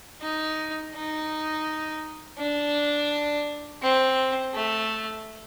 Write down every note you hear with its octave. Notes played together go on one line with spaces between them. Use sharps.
D#4
D#4
D4
C4
A3